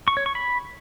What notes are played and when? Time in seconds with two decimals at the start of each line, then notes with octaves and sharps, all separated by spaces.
0.08 C#6
0.17 C#5
0.26 C#6
0.35 B5